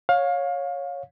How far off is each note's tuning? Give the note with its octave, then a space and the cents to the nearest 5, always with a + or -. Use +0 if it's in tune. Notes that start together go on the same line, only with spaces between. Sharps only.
C#5 +0 F5 +25